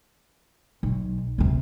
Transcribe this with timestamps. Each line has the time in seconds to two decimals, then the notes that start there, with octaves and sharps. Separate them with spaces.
0.83 B1
1.38 D2 C3